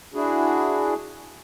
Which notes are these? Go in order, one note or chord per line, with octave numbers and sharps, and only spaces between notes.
D4 E4 F#4 G#4